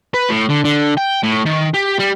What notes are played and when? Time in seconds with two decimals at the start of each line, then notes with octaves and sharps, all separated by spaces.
0.14 B4
0.29 A2
0.49 D3
0.64 D3
0.97 G5
1.23 A2
1.46 D#3
1.74 G4
1.99 G3